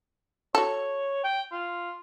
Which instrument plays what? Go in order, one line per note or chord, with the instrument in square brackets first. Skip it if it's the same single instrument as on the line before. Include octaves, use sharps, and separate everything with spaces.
[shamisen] F#4 A4 [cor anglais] C#5
[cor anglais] G5
F4